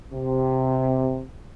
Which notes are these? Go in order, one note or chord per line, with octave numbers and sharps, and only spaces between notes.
C3